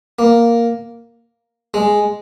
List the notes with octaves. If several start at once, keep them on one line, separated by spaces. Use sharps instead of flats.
A#3
G#3